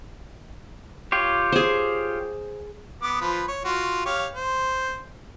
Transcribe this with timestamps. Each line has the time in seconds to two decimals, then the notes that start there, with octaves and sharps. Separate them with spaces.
1.12 F4 G4 C#5
1.52 G#4 C5
3.02 B3 D6
3.21 F3 B4
3.48 C#5
3.65 F4 F#4
4.05 G4 C#5 F5
4.34 C5